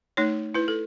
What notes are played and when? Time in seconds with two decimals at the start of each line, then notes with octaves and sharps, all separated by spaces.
0.17 A3 D#4 C#5
0.54 E4 B4
0.68 A4